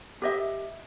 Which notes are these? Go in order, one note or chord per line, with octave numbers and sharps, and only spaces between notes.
G4 D#5 E5